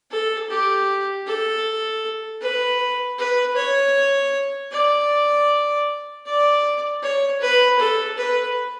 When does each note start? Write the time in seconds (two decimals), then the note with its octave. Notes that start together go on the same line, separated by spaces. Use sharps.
0.11 A4
0.50 G4
1.26 A4
2.42 B4
3.18 B4
3.56 C#5
4.72 D5
6.26 D5
7.03 C#5
7.41 B4
7.79 A4
8.18 B4